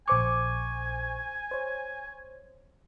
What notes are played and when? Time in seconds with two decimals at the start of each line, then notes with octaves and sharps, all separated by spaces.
0.08 A#1 C5 G#5 C#6 D6
1.51 C5 C#5